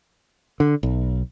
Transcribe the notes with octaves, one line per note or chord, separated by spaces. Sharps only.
D3
B1